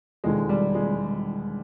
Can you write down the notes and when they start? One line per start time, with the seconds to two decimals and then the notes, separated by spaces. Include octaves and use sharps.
0.24 E1 D#2 D3 G#3
0.49 G3
0.75 G#3